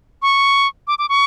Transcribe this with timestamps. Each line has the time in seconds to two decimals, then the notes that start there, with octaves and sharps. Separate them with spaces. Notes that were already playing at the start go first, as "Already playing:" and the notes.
0.22 C#6
0.88 D6
0.99 D6
1.09 C#6